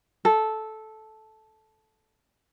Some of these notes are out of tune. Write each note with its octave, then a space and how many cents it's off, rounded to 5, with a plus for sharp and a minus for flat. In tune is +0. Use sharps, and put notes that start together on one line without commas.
A4 -10